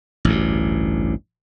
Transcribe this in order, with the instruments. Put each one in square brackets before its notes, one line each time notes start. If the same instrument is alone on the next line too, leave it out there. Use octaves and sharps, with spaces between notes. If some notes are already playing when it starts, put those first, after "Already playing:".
[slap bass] A1 D2 G2